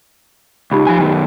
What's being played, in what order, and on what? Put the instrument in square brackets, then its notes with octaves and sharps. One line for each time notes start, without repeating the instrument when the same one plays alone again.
[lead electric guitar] C#2 [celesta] D#4 G4 B5
[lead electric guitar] F3 G#5
F#2 D#3